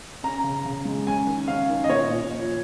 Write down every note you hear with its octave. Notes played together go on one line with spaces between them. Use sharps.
C#4 A#5
C#3
C#3
G#3
C#4 G#5
D#3
C#4 F5
D#3
D#5
A#2 C#5
A#2
F3